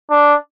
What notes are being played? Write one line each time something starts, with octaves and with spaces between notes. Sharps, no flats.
D4